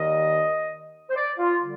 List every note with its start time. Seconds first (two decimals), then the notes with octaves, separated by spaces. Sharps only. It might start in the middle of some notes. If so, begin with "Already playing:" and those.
Already playing: D#2 D#3 G3 D#5
1.10 C5
1.16 D5
1.39 F4
1.61 D3 G3